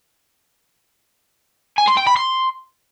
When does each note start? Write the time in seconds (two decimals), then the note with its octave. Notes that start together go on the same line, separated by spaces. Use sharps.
1.78 G#5
1.88 C6
1.97 G5
2.07 B5
2.17 C6